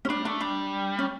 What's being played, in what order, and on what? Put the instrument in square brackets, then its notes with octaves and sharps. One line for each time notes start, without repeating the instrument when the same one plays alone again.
[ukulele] C#4
[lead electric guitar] G3 [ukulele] D4
[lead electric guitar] A3 [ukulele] D4
[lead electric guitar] G3 [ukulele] D4
[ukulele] C#4